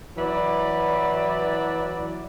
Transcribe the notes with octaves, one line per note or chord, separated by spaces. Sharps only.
E3 F#3 E4 B4 D5